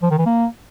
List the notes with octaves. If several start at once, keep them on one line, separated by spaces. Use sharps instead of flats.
F3
D#3
E3
A#3